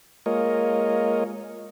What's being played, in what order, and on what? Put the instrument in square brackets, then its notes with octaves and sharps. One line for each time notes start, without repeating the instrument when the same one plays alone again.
[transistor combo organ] G#3 A#3 F4 A#4 C#5 D#5